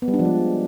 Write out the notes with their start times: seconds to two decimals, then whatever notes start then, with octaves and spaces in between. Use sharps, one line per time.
0.02 B3
0.08 G3
0.14 D4
0.19 F3
0.25 G#3